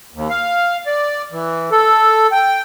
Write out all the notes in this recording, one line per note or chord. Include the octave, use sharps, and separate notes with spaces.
D#2
F5
D5
E3
A4
G5